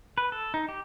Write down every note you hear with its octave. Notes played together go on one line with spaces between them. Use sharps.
B4
A4
D#4
G4